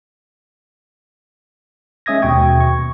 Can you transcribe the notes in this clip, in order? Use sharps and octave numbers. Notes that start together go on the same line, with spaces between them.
G#3 C#4 E5 D#6 G#6 A#6
D#2 B2 G5 C#6 G#6
C#6